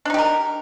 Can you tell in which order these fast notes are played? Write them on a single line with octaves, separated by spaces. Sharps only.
D4 D#4 G4 A#4